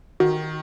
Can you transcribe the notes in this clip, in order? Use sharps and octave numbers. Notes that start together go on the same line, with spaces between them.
D#3 F#4